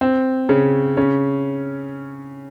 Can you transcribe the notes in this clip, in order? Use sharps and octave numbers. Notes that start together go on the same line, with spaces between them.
C4
C#3 C#4
C#3 C#4